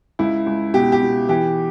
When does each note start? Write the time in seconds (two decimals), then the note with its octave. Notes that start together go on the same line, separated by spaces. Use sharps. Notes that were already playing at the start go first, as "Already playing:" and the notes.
0.19 C#2 E4
0.47 C#2
0.74 B2 G4
0.92 G4
1.01 B2
1.29 E3 G4